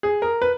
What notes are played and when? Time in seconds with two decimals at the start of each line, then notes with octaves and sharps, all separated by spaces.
0.03 G#4
0.22 A#4
0.42 B4